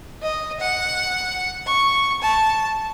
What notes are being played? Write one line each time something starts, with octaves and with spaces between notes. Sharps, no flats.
D#5
F#5
C#6
A5